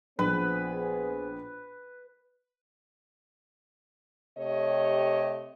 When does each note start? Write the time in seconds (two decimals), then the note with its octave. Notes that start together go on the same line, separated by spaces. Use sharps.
0.19 A#1 B3 G#4 B4 C5
4.38 C3 A3 G4 C#5 D#5